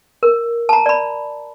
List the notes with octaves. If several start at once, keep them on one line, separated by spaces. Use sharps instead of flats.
A#4
A5 A#5
D5 B5